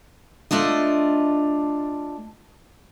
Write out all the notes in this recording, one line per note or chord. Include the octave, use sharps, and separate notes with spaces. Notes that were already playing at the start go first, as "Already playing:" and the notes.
A3 D4 F4 D#5